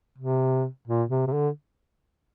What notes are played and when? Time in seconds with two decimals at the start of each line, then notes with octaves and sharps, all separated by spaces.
0.18 C3
0.88 A#2
1.10 C3
1.27 C3
1.33 D3